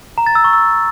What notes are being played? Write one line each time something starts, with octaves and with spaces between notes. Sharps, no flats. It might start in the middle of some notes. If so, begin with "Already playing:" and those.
A#5
A6
E6
C#6
E6